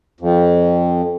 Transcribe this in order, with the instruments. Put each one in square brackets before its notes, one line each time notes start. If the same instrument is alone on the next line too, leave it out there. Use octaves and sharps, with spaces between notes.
[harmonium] F2